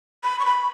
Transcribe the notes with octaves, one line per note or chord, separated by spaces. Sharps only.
B5
C#6
B5